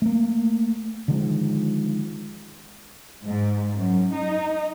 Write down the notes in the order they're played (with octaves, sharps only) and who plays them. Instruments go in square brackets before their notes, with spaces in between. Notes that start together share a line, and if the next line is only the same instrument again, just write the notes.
[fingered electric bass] A3 A#3
D3 D#3 F3 G#3
[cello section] G#2
F#2
D#4